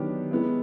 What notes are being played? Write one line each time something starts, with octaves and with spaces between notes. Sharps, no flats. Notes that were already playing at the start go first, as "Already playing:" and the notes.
Already playing: D#3 F#3 B3 D4 G4
G#3 B3 E4